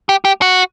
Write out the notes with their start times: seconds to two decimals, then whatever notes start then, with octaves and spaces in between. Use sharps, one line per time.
0.09 G4
0.25 G4
0.42 F#4